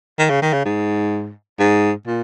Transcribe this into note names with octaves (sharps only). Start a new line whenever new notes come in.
D#3
C#3
D#3
C#3
G#2
G#2
A#2